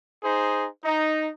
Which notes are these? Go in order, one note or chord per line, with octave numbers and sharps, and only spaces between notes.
D#4 G#4 C5
D#4